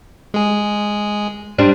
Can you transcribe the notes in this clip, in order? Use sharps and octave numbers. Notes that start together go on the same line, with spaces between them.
G#3 G#4
G3 C4 D4